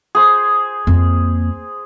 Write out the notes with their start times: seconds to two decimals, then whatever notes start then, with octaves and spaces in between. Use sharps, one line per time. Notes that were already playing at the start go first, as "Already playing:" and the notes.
0.15 G#4 C5
0.87 F2 A#3